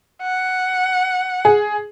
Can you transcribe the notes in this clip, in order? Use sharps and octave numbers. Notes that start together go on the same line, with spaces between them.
F#5
G#4